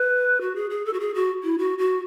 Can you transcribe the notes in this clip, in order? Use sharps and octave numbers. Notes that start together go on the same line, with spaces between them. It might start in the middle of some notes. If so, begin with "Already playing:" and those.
Already playing: B4
F#4
G#4
G#4
A4
F#4
G#4
F#4
E4
F#4
F#4